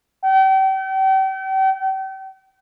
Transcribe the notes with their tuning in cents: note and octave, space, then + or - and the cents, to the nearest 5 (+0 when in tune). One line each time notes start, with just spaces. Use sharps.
G5 -40